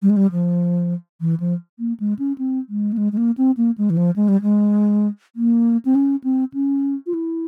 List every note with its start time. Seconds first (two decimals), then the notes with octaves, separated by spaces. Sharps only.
0.02 G3
0.10 G#3
0.17 G3
0.32 F3
1.21 E3
1.40 F3
1.79 A#3
2.00 G#3
2.19 C#4
2.38 C4
2.69 G#3
2.93 A#3
2.98 G#3
3.12 G#3
3.17 A#3
3.38 C4
3.57 A#3
3.78 G#3
3.90 E3
3.97 F3
4.16 G#3
4.28 G3
4.42 G#3
5.36 A#3
5.85 C4
5.95 C#4
6.24 C4
6.54 C#4
7.06 F4
7.14 E4